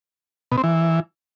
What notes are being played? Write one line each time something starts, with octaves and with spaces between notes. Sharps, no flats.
B2
C4
E3